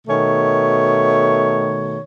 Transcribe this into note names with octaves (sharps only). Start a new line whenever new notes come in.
B2 D#3 A3 C#5